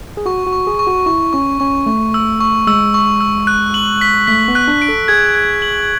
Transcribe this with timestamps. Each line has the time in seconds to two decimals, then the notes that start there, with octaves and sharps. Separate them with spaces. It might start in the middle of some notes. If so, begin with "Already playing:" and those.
0.17 G#4
0.26 F#4 C#6
0.47 F#4
0.53 C#6
0.67 G#4
0.79 C#6
0.87 F#4
1.06 E4 C#6
1.33 C#4 C#6
1.60 C#4 C#6
1.86 A3 C#6
2.14 E6
2.40 C#6
2.67 G#3 E6
2.94 C#6
3.21 E6
3.47 F#6
3.74 F#7
4.01 B6
4.27 A3 B6
4.48 B3
4.55 F#6
4.68 D4
4.82 D7
4.89 A4
5.08 G#4 G#6
5.35 G#6
5.62 F#7